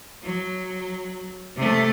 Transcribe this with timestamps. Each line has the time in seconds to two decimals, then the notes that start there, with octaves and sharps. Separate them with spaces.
0.23 F#3
1.56 C3 A3